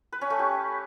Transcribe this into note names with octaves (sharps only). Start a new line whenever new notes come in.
B4
C#4
A3
G4